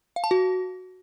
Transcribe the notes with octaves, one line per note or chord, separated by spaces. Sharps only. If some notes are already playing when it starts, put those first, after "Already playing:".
F5
A5
F#4